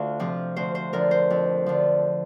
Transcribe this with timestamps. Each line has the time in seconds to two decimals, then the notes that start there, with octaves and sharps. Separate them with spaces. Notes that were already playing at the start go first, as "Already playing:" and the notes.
Already playing: D2 D4 F4 F5
0.20 C3 F3
0.56 D2 C5
0.75 C5
0.93 D3 F3 A#4
1.11 C5
1.30 F2
1.66 D3 F3